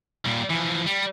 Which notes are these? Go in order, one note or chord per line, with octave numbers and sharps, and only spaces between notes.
A#2 G3
E3 F3
G3